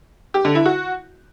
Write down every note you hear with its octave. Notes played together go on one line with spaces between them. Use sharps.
G4
D3
E4
F#4